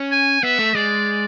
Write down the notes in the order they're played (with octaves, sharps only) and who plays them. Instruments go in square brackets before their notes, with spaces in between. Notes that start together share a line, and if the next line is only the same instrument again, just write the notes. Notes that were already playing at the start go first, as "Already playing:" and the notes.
Already playing: [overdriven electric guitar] C#4
[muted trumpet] G#5
[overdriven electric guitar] B3 [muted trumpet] E5
[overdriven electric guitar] A3
[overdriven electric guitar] G#3 [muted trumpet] D5